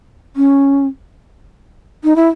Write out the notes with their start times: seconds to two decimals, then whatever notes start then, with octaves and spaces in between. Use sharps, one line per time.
0.36 C#4
2.04 D#4
2.16 E4